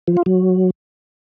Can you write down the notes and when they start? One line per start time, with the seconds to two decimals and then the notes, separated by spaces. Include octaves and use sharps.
0.08 F3
0.17 F4
0.26 F#3